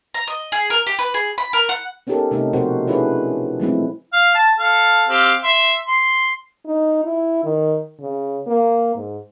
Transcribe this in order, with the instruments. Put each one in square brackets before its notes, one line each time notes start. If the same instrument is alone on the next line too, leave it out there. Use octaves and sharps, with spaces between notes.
[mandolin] A#5
D#5
G#4
A#4
G4
B4
G#4
B5
A#4
F#5
[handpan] B3 C#4 D#4 G4 A4 A#4
C3 A3 D#4 A4
B2 F3 F#4 G4 A#4 C5
C#4 D4 E4 G#4 A4 B4
F3 F#3 G#3 A3 C4 E4
[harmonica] F5
A5
A4 F5
C4 G4 F5
E5 C6
C6
[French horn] D#4
E4
D#3
C#3
A#3
G#2